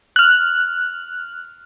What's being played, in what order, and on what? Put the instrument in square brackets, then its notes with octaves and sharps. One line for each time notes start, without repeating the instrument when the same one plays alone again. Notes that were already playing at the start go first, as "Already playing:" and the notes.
[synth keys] F6 F#6